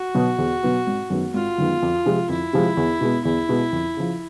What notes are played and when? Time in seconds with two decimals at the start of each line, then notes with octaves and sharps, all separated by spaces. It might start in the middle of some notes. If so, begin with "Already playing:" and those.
Already playing: F#4
0.15 B2 F#3 B3
0.38 E2
0.63 B2 F#3 B3
0.87 G#1
1.10 F#2 D#3 G#3 B3
1.34 G#1 F4
1.58 F#2 D#3 G#3 B3
1.82 F2
2.06 C3 F3 G#3
2.29 F2 E4
2.53 C3 F3 G#3
2.77 E2
3.01 B2 G#3 B3
3.25 E2 E4
3.49 B2 G#3 B3
3.72 F2
3.97 C#3 F3